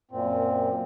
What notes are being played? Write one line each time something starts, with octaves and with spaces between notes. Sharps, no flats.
F#2 A#2 C4